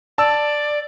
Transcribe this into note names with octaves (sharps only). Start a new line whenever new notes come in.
D5 A5 E6